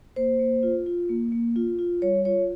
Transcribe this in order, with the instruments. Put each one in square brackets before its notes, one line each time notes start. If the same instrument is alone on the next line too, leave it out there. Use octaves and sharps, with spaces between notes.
[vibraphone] A#3 C5
A#3
F4
F4
A#3
A#3
F4
F4
G3 C#5
F4 C#5